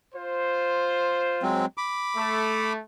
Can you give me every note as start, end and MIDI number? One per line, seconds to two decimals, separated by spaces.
0.15 1.53 65
0.15 1.53 72
1.43 1.66 54
1.43 1.66 56
1.43 1.66 60
1.78 2.73 83
1.78 2.73 86
2.16 2.79 57